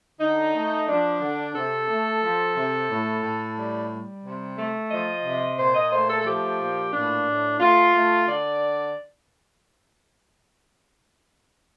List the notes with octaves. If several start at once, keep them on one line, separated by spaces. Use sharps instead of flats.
D3 D#4
A3
F3 D4
D3
C3 A4
A3
F3
C3
A2
A2
G3
G3
C3
A3
F3 D#5
C3
A#2 C5
D#5
A3 C5
A4
A4
F3 G4
A#2
A2 D4
A2
A3 F4
A3
D3 D5